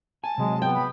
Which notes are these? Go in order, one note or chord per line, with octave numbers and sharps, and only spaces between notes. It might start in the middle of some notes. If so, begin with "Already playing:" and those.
G#5 A5
C3 F#3 G#3
B3 G5
B5